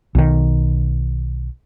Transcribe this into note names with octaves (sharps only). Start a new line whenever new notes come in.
B1 D#3